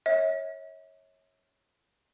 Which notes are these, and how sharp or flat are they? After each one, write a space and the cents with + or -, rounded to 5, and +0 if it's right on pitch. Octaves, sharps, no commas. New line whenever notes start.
C#5 -15 E5 -40